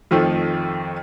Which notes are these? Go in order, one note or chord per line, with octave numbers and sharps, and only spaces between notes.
F2 D#3 F3 A3